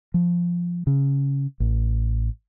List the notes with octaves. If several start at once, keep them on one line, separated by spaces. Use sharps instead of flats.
F3
C#3
A1